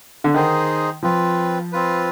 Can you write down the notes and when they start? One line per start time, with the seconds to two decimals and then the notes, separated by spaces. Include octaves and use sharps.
0.24 D3
0.34 D#3 D#4 G#4 C5
1.03 F3 C4 F4 B4
1.72 C4 F4 B4